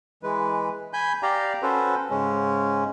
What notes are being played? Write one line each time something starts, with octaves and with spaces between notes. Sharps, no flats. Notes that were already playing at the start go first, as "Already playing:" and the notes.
E3 G#3 B4
G#5 B5 G6
G4 D5 F5 G5 A#5
C#4 F#4 A4 B4 C5
G#2 C#3 G#3 C#4